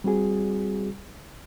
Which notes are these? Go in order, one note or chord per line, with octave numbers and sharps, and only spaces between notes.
G3 C4 F#4 G#4